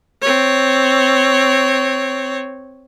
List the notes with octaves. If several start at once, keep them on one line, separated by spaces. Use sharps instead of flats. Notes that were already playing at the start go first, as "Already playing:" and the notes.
C4 C#5